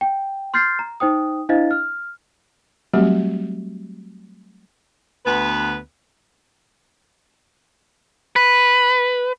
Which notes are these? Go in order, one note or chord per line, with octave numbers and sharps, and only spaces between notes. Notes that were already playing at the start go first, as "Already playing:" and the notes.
G5
C6 F6 G6 A6 C7
A#5
D#4 C5 G5 D#6
D4 E4 C5 D#5 F5 A6
F6
F#3 G3 A3 C4 F#4 G4
D2 B3 B4
B4